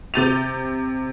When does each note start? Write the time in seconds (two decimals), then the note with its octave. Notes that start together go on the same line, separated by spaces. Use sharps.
0.14 C3 G6 A6 D#7 F7